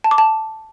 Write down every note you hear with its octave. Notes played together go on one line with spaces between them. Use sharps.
A5
D6
A5